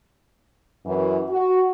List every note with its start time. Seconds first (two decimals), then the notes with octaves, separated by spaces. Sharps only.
0.86 F#2 E3
1.29 F#4